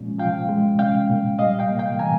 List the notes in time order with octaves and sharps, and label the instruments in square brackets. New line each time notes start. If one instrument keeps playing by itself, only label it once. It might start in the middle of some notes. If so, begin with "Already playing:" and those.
Already playing: [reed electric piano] A#2 F3 G#3 C#4
F3 F5 G5
G#3
C#4 F5 G5
A#2
G3 D#5 F5
F5 G5
A#3
F5 G5
E3 G#5 A#5